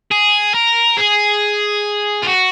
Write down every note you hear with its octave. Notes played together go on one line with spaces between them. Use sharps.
G#4
A#4
G#4
F4
F#4